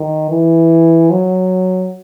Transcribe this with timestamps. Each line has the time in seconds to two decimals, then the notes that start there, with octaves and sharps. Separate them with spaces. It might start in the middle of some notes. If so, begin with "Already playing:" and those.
Already playing: D#3
0.30 E3
1.11 F#3